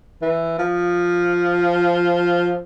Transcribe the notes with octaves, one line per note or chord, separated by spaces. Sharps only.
E3
F3